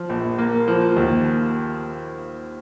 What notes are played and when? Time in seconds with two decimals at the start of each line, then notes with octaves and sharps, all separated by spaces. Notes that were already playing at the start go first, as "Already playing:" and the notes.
Already playing: F3
0.09 A#1
0.38 A#3
0.68 F3
0.96 D#2